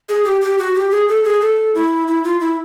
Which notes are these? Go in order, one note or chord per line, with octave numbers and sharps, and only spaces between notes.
G#4
G4
G4
F#4
G4
G#4
A4
G#4
A4
E4
E4
F4
E4